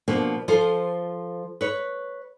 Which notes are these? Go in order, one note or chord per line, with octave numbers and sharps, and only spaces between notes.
B2 F3 A#3 D4
F3 F4 A4 C5
B4 C#5